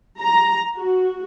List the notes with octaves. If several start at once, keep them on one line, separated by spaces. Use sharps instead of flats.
A#5
F#4